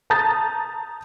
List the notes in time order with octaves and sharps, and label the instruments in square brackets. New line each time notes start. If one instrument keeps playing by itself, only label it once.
[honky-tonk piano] A5 A#5 D#6 G6 A6